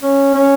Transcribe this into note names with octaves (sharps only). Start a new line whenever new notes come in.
C#4
C#4